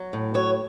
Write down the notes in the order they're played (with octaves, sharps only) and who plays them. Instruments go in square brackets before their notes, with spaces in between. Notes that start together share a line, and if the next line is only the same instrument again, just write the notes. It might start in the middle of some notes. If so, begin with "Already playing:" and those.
Already playing: [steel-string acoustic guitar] F#3
A2
F#3 C#5